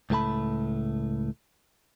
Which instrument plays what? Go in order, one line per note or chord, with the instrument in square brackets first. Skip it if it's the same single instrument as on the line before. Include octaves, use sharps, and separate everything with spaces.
[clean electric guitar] C#2 A2 A3 A5 B5